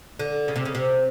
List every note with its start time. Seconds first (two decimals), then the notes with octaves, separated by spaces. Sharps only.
0.19 D3
0.48 C#3
0.56 C3
0.65 C#3
0.75 C3